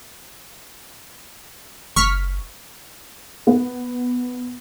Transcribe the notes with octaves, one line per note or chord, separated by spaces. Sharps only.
F#1 C#6 F6 B6
B3